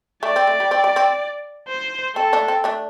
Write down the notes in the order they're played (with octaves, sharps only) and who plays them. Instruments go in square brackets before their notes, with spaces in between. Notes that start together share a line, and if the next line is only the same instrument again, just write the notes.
[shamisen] A3 [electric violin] D5
[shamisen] C4
A3
G3
C4
G3
C4
[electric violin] C5
[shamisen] C4 [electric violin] A4
[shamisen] A3 D4
C4
A3 D4